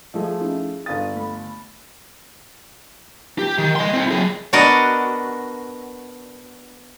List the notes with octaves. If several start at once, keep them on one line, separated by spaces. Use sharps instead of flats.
F3 A3 G#4 D#5 E5
C#4 D#4 E4
G1 F5 D#6 A6
A3 B5
G4
D#3
D#5 C6
C4 E4
F#3 G#4
B3 D4 F#4 A#4 D5 D#5